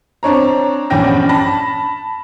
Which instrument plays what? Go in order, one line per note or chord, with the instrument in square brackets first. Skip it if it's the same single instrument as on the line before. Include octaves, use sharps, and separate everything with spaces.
[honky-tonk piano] C4 D4 C#5 A#5
A#1 E2 G2 C#4 G5 A#6
A5 B5 A#6